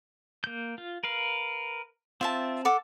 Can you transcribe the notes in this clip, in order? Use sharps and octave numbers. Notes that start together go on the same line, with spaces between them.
A#3 G6
F4
A#4 B4 F5
C4 F4 E5 A5
A4 F#5 D6